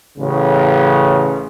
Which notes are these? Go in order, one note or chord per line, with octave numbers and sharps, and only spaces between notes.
A1 C#3